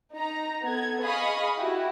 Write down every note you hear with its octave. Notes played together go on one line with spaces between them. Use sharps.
D#4 A#5
B3 A4 G#6
G#4 D#5 F5 B5 C#6 D#6
E4 F#4 G4